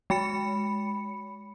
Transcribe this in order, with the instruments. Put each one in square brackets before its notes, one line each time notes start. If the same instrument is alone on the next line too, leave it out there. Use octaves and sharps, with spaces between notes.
[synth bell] G#3 B5 C#7